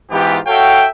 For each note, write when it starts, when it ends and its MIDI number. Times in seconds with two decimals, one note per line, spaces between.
0.11 0.38 44
0.11 0.38 52
0.11 0.38 59
0.11 0.38 65
0.11 0.38 67
0.47 0.86 66
0.47 0.86 69
0.47 0.86 73
0.47 0.86 76
0.47 0.86 77
0.47 0.86 79